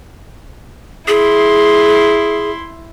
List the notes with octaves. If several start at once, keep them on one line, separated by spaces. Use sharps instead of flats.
E4 G#4 C6